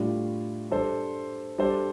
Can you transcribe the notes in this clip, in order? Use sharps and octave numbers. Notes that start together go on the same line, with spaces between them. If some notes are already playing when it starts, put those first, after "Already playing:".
Already playing: A2 G3 D4 F4
G3 D4 A4 C5
G3 D4 A4 C5